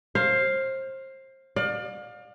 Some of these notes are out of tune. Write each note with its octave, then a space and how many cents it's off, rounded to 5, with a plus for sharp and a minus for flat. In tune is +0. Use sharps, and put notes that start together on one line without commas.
C5 +30 F5 +0
D5 +35 F5 +30